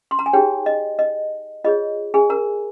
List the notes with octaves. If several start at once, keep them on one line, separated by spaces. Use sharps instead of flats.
C6
A#5
G#5
D#4 G4 G#4 C#5 G5
D#5
D#5
F4 G#4 C#5 D#5
G#4 G#5
A#4 A#5